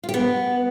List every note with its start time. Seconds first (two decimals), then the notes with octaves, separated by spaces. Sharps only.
0.04 F4
0.09 G4
0.14 B3